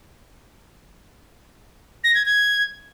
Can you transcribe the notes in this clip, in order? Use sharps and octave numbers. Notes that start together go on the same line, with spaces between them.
A#6
G#6
G#6